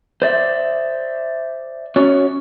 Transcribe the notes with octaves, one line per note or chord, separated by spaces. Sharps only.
C5 D5 E5
C#4 F#4 C#5